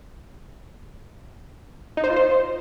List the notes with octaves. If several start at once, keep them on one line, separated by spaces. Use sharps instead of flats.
D#4
C5
F4
C5